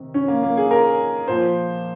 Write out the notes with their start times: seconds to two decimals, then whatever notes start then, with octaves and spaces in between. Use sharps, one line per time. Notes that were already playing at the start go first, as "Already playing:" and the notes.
Already playing: C3 D#3
0.14 C#4
0.28 A#3
0.43 A#3
0.57 G#4
0.71 A#4
1.28 A#2 F3 C5